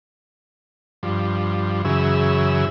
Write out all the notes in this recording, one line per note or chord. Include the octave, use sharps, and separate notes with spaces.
G2 F3
F#2 C#3 E3 G#4 E6